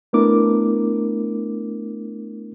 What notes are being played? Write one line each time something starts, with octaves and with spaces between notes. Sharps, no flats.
A3 B3 D4 E4 A#4 D6